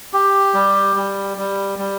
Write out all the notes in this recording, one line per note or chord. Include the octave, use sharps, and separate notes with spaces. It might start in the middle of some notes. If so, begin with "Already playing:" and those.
G4
G3
G3
G3
G3